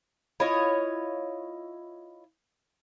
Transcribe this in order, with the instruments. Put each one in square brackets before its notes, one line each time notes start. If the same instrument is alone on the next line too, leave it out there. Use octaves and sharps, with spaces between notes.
[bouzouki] E4 F4 C#5 D#5